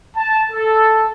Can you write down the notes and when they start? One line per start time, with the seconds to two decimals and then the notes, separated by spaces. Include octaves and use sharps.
0.16 A5
0.51 A4